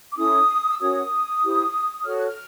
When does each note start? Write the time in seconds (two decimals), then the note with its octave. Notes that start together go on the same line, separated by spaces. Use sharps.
0.12 D6
0.17 C#4 E4 A4 D#6
0.69 E6
0.80 C#4 F#4 A#4 C#5 D#6
1.42 E4 G4 C5
2.04 F#4 A4 C#5 F6
2.17 F#6
2.28 F6